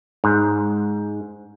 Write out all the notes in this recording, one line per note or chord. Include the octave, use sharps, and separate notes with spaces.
G#2